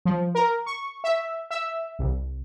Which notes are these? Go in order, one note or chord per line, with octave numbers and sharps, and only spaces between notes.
F3
A#4
C#6
E5
E5
C2